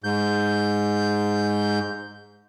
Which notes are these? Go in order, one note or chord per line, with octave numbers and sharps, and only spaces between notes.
G#2 G6